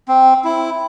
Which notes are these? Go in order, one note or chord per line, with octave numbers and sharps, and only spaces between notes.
C4
E4